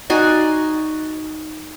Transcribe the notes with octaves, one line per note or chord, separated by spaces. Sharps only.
D#4 F#4 D5 G#5